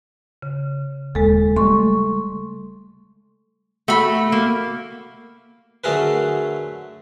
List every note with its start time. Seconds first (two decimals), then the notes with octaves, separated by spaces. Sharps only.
0.42 C#3
1.15 D#1 D#2 G#3 A4
1.56 G3 A3 C6 C#6
3.88 A3 F#4 B5
4.32 A#3
5.84 D3 F#3 A3 G#4 A#4 B4